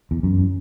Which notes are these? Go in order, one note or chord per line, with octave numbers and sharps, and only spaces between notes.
E2
F#2